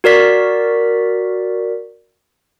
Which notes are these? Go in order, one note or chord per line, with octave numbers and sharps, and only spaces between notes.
F#4 A#4 D5 B6